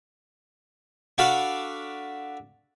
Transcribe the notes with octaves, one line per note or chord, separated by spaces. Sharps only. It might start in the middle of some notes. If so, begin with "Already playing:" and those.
D4 F#4 A4 F5 A5 B5